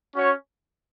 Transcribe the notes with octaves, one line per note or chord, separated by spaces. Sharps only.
C#4 F#4 C#5